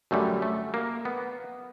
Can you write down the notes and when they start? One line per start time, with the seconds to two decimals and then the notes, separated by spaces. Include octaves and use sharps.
0.11 F#2 D3 G3 A3
0.42 A3
0.74 A#3
1.05 B3